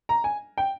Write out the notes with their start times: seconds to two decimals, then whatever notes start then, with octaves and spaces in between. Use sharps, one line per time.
0.09 A#5
0.24 G#5
0.58 G5